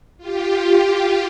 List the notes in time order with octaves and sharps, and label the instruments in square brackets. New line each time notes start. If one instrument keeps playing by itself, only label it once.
[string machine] F4 G4